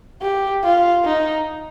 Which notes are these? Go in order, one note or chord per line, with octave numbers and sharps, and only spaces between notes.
G4
F4
D#4